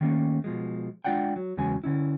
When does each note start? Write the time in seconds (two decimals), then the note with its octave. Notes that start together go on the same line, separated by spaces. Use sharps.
0.01 D#3 A3 A#3 C#4
0.44 B2 F3 G#3
1.04 G#3 D4 F4 D5 F#5 G5
1.36 F#3
1.57 E2 C#3 F#3 G#3 C#4 G#5
1.84 D3 C#4 E4